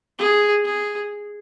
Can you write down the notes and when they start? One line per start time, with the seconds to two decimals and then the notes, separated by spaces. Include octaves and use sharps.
0.18 G#4
0.65 G#4